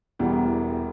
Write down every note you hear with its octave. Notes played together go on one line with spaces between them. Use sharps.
E1 E2 E3 G3